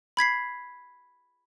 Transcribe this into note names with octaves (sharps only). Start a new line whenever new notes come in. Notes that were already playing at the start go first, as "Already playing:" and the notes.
B5 G#6 B6 C7